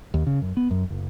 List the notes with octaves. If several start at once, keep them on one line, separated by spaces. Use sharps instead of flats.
D#2
C#3
F#2
B3
F#2
F#1